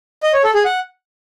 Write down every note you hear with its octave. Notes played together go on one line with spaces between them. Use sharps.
D#5
C#5
A4
G#4
F#5